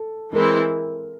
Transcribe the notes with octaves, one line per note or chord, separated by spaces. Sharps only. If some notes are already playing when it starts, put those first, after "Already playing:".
Already playing: A4
E3 G#3 C4 E4 A#4